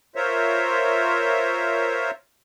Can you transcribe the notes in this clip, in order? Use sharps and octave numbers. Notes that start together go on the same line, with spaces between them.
F4 A#4 C5 C#5 E5